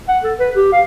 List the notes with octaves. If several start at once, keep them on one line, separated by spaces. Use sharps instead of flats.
F#5
A4
B4
G4
F5